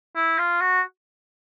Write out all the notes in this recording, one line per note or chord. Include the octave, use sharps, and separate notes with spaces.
E4
F4
F#4